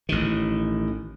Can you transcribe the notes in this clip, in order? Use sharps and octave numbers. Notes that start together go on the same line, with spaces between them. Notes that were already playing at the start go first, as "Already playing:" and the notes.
A1 D#3